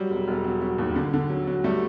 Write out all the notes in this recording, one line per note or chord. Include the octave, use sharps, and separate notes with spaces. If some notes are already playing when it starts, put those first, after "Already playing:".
Already playing: F#3 G3
E1
E1
F#3
F#3
D#2
D3
D3
F#3
F#3
G3 A3